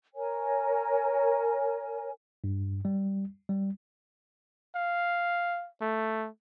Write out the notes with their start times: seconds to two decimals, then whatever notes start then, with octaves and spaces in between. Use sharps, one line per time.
0.14 A#4 C#5 G#5
2.44 G2
2.85 G3
3.49 G3
4.75 F5
5.82 A3